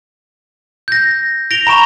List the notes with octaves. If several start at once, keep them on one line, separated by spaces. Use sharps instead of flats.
G6 A#6
A#6 D7 F7 G7
A#5 B5 C#6 E7